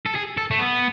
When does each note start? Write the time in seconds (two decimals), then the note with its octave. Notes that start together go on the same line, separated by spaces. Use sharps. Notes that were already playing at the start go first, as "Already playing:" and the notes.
0.06 A4
0.15 G#4
0.37 A4
0.51 A3
0.59 B3